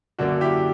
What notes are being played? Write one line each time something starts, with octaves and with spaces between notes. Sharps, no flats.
F#2 D3 F#3 A#3 D4 F#4
E4 G4